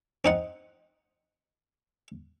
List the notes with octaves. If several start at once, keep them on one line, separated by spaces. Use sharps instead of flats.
C4 D#4 F#5